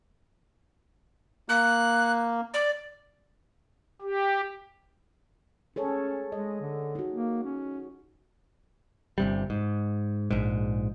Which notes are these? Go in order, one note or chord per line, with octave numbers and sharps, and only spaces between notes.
A#3 F#6
D5
G4
C#4 G#4 A4 C#5
G#3 D#5
D3
D#4 F#4
A#3
C#4
G1 C3 G3
G#2
A#1 G#2